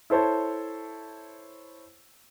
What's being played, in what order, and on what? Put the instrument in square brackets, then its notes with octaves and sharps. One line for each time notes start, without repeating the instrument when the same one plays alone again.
[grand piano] E4 A4 C5 C#5 A5